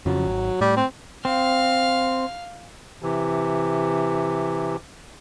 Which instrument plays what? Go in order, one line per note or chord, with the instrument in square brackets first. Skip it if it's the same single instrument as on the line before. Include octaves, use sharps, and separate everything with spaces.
[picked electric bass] F2 C#3 F3 [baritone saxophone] F#3
[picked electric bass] G#1
[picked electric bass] A2 [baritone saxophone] G3
[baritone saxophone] C4
[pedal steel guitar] C4 [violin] F5
[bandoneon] C3 E3